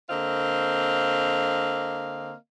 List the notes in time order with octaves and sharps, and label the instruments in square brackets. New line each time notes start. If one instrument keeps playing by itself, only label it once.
[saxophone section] D3 A#3 C4 D#5 F5